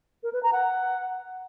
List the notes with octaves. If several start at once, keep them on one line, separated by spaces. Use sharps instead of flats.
A#4
B4
A#5
F#5